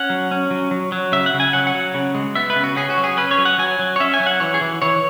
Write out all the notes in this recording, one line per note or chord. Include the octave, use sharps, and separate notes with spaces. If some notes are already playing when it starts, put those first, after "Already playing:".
Already playing: C#4 F#5
F#3
C#4
F#3
F#3
F#3
C#3 E5
F#5
C#3
G#5
F#3 F#5
F#5
F#3
C#3
G#3
B3 E5
B4
C#3
F#4
C#4 G#4
F#4
F#3
G#4
C#4 B4
C#5
F#3
F#5
F#3 G#5
F#3
C#5
C#4 E5
G#5
F#3
F#5
E3 C#5
G#4
E3
E3 C#5